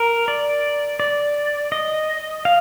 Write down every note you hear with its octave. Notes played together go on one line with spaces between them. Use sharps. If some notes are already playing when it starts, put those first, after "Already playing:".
Already playing: A#4
D5
D5
D#5
F5